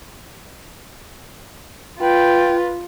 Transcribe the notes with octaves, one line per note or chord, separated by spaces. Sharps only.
F4 B4 G5